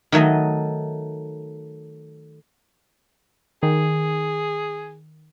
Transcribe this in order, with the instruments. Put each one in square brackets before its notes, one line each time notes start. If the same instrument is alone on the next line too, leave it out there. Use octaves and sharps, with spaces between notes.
[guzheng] D#3 F#3 A3 D#5
[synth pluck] D#3 [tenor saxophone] G#4